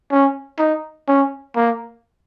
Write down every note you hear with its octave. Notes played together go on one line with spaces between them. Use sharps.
C#4
D#4
C#4
A#3